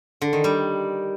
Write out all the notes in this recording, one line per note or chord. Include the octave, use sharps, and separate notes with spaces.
D3
D#3
G3